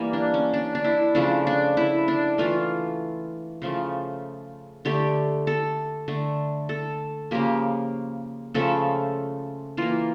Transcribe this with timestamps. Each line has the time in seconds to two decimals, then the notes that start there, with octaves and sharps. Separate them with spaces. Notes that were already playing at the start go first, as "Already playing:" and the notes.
Already playing: E3 G3 A#3
0.13 D4
0.34 C#4
0.54 D4
0.75 D4
0.84 E4
1.15 C#3 F3 A3 D4
1.47 D4
1.77 E4
2.08 D4
2.38 E3 A3 F4
3.62 C#3 F3 A3
4.85 D3 A3 G4
5.47 A4
6.08 D3 A3
6.69 A4
7.31 C#3 F3 A#3 G4
8.54 C#3 F3 A3 A4
9.77 E3 A#3 F4